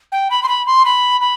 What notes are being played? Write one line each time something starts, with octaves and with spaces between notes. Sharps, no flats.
G5
B5
C6
B5
C6
B5
B5